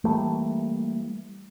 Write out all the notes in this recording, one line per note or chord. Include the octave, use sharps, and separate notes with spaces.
E3 G3 A3 A#3